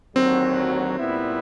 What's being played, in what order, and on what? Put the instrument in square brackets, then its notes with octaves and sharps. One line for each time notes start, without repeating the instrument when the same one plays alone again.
[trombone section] D#2 D3 F#3 [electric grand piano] C4
[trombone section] A#2 G3 B3 E4